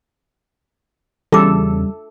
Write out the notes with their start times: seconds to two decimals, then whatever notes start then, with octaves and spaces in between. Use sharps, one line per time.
1.32 E2 C#3 G3 F4 A4 D6